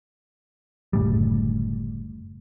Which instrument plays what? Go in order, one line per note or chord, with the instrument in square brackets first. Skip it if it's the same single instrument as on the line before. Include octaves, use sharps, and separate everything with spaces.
[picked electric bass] F#1 D2 A2 G3